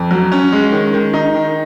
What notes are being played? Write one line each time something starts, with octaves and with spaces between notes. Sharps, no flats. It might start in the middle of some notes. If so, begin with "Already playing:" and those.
Already playing: F2
F#3
C#4
G#3
D#3
D#3
D#4
D#3